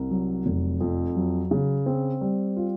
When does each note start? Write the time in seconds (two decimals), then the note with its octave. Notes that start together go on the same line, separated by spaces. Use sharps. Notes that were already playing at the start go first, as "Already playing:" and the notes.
Already playing: C2
0.10 F#3
0.46 F1
0.81 F2
1.15 F#3
1.51 C#3
1.86 C4
2.21 G3
2.57 F4